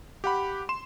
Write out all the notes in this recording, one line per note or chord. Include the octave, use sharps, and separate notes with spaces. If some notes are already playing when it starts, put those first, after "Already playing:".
G4 F#5 B5
C6 E7